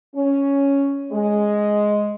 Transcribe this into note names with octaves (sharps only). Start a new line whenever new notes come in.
C#4
G#3